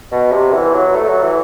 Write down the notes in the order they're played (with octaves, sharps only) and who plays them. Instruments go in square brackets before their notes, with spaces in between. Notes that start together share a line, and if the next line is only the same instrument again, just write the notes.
[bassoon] B2
C3
E3
F#3
A3
F#3
E3